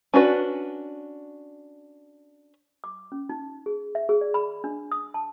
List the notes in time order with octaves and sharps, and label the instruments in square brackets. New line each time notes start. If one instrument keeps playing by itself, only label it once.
[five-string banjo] C#4 D4 F#4 B4
[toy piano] D6
C#4
D#4
G#4
E5
G#4
D5
B5
D4
D#6
A5